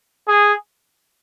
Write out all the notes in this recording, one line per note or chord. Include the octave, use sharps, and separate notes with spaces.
G#4